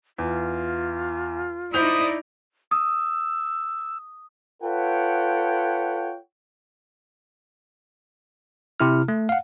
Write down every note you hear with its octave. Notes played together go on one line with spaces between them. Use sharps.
E2 F4
D#4 E4 C5 D5 D#6 G6 F7
D#6 E6
F4 A4 B4 C#5 F#5 G5
C3 E4 F6
A3
F5 F#5